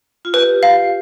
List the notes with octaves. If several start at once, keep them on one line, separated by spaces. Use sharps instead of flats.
F4
G4 B4
F5